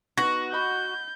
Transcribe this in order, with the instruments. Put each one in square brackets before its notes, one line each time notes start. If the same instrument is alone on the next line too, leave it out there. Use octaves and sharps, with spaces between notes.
[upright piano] B3 D#4 A#6 [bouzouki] F#4
[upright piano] D#5 F#5 B5 [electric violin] G6